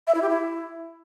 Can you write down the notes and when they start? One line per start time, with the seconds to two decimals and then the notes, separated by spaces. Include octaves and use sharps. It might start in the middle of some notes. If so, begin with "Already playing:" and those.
0.07 E5
0.14 E4
0.22 G4
0.29 E4